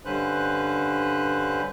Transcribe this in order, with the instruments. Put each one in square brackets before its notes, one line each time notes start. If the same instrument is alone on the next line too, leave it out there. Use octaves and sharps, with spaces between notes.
[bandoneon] G2 D3 C#4 B4 C5 F#6